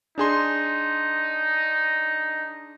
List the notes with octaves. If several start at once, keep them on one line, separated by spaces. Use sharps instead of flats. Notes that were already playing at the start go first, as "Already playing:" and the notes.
D4 D#4 G#4 C6